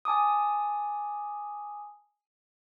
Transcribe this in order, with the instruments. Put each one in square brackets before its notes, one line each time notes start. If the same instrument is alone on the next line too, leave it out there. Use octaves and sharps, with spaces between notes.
[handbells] G#5 A5 D6 D#6